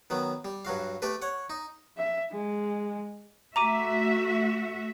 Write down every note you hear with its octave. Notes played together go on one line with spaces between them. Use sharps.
D#3 F#3 B3
G3
G2 F#3 F#4 F5
A3 G4 A4 B4
C#5 F#5
D#4
E5
G#3
A3 F#4 E5 A#5 D6 D#7